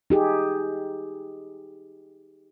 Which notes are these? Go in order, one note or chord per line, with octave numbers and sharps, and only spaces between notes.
D#4 G4 G#4